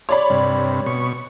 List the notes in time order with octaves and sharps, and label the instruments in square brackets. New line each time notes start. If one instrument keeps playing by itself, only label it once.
[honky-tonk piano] C#5 D5 B5
[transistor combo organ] G2 C3
B2 C#6